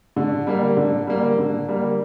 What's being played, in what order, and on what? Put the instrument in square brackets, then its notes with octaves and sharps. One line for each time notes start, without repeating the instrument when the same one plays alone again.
[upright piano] D3
G3 A#3
D3
G3 A#3
D3
G3 A#3